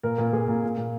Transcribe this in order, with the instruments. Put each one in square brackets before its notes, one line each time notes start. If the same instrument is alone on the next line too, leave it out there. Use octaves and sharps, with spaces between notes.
[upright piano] A#2 A#4
A#2
A#2 G#4
A#2
A#2
A#2